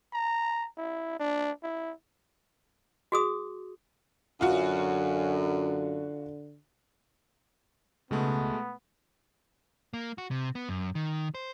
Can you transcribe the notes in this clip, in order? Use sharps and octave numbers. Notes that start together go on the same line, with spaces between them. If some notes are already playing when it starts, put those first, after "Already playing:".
A#5
E4
D4
E4
F#4 G#4 D#6
F#2 D3 F4 F#4
C#2 B2 G#3 A3 B3
A#3
F#4
C3
B3
F#2
D#3
C5